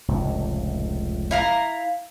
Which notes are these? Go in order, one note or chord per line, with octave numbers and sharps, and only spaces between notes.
F1 C#2 A2
E4 F5 A#5